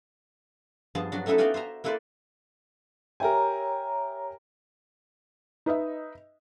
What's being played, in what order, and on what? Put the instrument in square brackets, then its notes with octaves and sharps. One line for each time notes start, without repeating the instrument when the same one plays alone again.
[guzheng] G2 F3 B3 G#4 A5
F#3 D4 F#4
A3 C#4 D#4 E4 A4 B4
B3 F#4 D5 F5 G5 G#5
C5 E5 G#5 A#5
A#3 E4 A4 B4 C5 D5
[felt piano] G4 E5 G5 [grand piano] A#4 G#5 [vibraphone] C#5 A#5
[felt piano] D#4 B4 D#5 E5